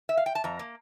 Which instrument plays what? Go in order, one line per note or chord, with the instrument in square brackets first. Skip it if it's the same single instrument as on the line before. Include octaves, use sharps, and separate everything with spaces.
[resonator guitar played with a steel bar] E5
F5
G5
A5
F2 A#5
A#3